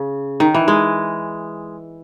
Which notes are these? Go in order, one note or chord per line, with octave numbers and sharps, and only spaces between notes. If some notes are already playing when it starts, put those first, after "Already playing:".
Already playing: C#3
D#3
E3
G#3